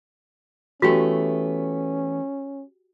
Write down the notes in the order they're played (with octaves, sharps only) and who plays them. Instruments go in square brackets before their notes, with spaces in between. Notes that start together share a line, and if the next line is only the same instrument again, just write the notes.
[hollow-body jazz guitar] E3 A3 B3 [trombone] C#4 [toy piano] F#4 G4 G5